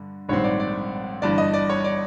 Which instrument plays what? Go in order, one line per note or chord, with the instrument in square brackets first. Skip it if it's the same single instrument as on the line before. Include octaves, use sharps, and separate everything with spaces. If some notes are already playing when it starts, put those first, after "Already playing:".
Already playing: [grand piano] G2 D3
A#1 G#2 D#3 G3 C4 C#5
D5
D5
G1 G2 E3 D5
D#5
D5
C#5
D5